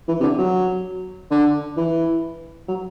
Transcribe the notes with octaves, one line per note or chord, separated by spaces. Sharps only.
E3
C3
D3
F#3
D3
E3
F#3